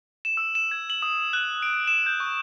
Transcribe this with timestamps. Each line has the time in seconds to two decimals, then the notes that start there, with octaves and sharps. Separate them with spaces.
0.25 E7
0.37 E6
0.55 E7
0.71 G#6
0.90 F#7
1.02 D#6
1.33 F#6
1.62 D7
1.87 E7
2.06 G6
2.20 C#6